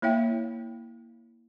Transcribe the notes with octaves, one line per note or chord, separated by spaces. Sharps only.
A#3 E4 C#5 E5 F5 G5